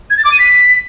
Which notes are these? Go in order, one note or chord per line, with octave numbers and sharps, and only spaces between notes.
G#6
A6
D6
D#7
B6